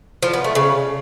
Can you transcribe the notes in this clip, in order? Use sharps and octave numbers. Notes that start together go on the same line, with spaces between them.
F3
B3
A3
C#3